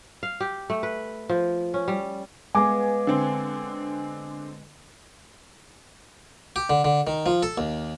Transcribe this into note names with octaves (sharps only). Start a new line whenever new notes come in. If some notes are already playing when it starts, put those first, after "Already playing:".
F5
G4
A3
B4
F3
C#4
G3
G#3 B3 F5 G#5 D6
D3 C4
G4
D3
D3
D#3
F3
A4
D#2